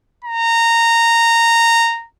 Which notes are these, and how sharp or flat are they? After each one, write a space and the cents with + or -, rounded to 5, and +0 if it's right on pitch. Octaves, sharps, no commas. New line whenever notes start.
A#5 -15